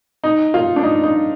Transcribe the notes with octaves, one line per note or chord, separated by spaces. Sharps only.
D#4
F4
D4
D#4
D#4